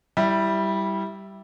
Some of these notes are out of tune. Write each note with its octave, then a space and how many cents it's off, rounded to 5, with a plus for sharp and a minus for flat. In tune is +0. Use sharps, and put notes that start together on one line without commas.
G3 -5 E4 +0